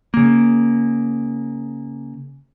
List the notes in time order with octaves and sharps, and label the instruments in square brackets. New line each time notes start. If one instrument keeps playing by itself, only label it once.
[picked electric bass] C#3 A#3